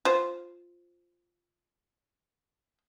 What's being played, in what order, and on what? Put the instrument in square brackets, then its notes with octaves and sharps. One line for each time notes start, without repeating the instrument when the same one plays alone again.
[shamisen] F4 C5